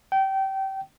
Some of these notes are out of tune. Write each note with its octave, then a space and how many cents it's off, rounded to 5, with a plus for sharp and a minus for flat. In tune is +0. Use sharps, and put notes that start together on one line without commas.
G5 -25